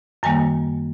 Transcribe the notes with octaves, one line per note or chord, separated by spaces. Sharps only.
F#2 D#3 G3 A#3 G#5